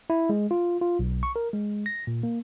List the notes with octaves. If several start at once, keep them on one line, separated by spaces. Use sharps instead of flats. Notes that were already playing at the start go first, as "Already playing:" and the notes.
E4
G#3
F4
F4
B1
C#6
A#4
G#3
A#6
A#2
A#3